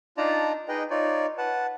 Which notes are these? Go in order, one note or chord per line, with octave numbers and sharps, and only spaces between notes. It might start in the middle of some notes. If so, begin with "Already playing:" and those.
D4 D#4 F4 D5 A5 A#5
D#4 G#4 B4 D#5 G5
D#4 F4 C#5 D5
B4 F#5 A5